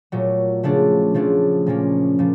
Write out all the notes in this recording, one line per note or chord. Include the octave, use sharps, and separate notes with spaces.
A#2 F#3 A3
C#3 F3 A3 D4
C#3 F3 A3 D4
A#2 F3 A#3 C#4
A#2 F3